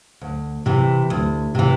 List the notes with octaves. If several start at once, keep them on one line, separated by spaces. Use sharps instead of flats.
D2
C3 E3
D2
C3 E3